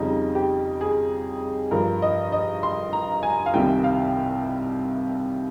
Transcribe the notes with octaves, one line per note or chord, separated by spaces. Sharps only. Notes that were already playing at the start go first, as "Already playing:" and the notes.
Already playing: F2 C#3 G3 D#4
G4
G#4
G2 F3 A#4
D#5
D#5
C6
A#5
G#5
F5
C2 C3 D#3 G3 G5
F5